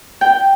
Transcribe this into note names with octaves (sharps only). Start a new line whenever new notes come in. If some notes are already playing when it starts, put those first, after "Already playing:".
G5